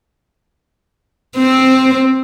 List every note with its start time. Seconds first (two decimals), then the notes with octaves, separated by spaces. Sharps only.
1.36 C4